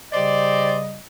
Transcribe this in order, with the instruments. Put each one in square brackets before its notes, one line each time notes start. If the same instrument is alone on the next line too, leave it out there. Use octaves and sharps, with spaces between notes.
[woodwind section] C#3 G3 D#5 [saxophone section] G4 C5 D5